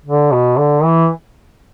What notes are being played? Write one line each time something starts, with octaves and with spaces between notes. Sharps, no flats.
D3
B2
D3
E3